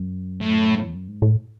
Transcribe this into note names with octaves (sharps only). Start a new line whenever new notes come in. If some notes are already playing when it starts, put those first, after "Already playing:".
Already playing: F#2
A2
E2
F#2
G#2
A2